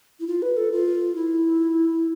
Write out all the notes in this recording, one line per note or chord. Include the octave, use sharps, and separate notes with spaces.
E4
F4
B4
A4
F4
E4